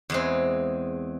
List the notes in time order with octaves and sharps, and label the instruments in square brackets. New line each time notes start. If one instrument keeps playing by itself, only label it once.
[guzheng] E2 G#3 C4